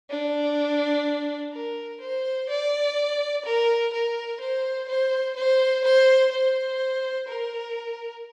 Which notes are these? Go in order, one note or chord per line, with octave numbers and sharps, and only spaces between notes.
D4
A#4
C5
D5
A#4
A#4
C5
C5
C5
C5
C5
A#4